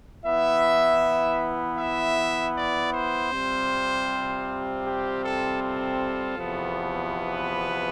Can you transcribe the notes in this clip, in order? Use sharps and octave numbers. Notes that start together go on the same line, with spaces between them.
E3 B3 E4 E5
E5
D5
C5
C3 G3 C4 F4
G4
A4
A4
E2 C3 F3 B3
B4